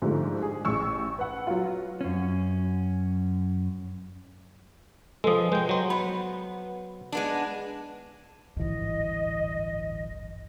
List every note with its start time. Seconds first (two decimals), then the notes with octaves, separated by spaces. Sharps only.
0.02 G#2 D3 F3 G3 A3
0.43 G#4
0.65 A1 C#6 E6
1.19 B4 F#5
1.47 F#3 F4
2.01 F#2 C#4
5.24 F3 G#3 A4 B4 D#6
5.52 G#3 B4 G5 G6
5.69 F#3 C5
5.90 B3 B5
7.12 G#3 B3 D4
8.57 D1 G#1 G2 E3 D#5